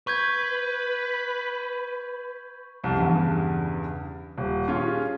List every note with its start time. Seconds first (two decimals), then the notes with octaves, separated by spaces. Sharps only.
0.07 B4 C#6 G6 G#6
2.84 C2 F2
2.97 E2 G2 C#3
4.38 D#1
4.68 C#4 F4 G#4